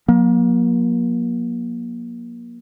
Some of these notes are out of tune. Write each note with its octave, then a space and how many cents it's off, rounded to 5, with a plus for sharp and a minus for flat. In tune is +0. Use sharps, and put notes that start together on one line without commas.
F#3 -45 A#3 +25